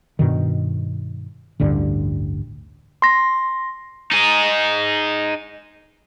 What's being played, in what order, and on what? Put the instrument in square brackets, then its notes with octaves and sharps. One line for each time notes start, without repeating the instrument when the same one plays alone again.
[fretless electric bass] G2 B2 D#3
A1 D2 G2 D3
[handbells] C6 A#6
[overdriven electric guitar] D#4 G#4